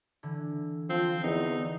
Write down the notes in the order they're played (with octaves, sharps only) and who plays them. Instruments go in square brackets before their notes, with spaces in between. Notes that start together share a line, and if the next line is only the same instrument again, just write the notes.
[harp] D3 E3
[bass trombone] F3 [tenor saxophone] C4
[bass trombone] E2 [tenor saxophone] D#4